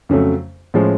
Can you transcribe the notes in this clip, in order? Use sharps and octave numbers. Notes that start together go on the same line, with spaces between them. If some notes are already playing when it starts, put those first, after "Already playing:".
F2 C#3 F#3 A3
A2 F3 G#3 C#4